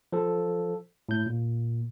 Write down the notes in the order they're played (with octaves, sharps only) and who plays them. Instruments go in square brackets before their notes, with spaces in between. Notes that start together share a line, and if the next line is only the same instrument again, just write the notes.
[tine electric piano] F3 A4
A2 G6
A#2